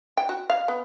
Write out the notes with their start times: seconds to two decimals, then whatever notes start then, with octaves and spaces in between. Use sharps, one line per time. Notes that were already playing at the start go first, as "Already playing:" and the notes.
0.17 G5
0.29 F#4
0.50 F5
0.68 B3